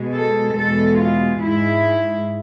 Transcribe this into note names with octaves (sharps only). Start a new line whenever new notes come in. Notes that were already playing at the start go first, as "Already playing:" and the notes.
Already playing: B2 G#3
A4
E2 B2 G#3 A4
F4
G#2 G#3 E4